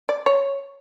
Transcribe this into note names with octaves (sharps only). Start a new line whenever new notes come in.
D5
C#5